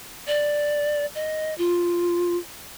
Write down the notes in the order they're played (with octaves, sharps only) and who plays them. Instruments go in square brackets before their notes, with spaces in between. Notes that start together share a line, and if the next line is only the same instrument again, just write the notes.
[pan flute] D5
D#5
F4